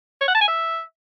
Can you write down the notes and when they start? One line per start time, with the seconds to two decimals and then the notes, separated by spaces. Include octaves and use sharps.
0.21 C#5
0.28 F#5
0.35 A5
0.41 G#5
0.48 E5